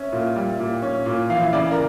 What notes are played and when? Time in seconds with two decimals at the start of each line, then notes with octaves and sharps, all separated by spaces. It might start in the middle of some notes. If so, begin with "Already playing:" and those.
Already playing: C#4 E5
0.12 A#2
0.36 G3
0.60 A#2
0.82 C#4
1.06 A#2
1.30 E3 F5
1.43 E5
1.53 C#3 D5
1.71 A#4